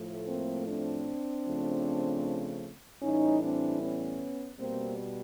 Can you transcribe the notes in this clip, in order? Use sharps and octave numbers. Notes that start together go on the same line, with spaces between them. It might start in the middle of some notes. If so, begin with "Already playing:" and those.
Already playing: A2 F3 A3
A#3 C4
C4 D4
C#3 F3 A3
A2 E3 G3 C#4 D#4
C4 D4
B3 C#4
B2 G3 A#3 C4